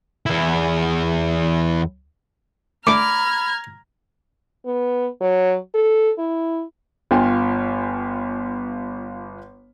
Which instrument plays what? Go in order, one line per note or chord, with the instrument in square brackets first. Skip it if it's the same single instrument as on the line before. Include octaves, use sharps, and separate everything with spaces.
[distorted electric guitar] E2 E4
[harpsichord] A3 D4 [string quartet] A#5 F6 G#6 [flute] B5 [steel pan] D6
[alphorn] B3
F#3
A4
E4
[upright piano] G1 F4 G5 G#5